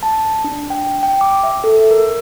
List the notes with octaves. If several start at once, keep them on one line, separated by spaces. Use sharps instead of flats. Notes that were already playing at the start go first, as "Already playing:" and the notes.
A5
D4
G5
G5
D6
E5
A4
A#4